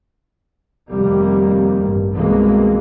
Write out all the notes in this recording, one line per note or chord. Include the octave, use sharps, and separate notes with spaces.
F1 F2 C3 D#3 G3 A#3
A1 G2
C2 B2 E3 G#3 A#3